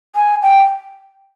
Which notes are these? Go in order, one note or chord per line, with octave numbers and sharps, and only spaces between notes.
G#5
G5